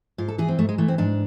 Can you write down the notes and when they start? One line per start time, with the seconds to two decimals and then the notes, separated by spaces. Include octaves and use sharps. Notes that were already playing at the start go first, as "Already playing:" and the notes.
0.18 G#2 F4
0.28 A4
0.38 E3 G#4
0.49 C4
0.58 G#2 A3
0.69 G#3
0.78 E3 A3
0.88 C4
0.98 G#2 D4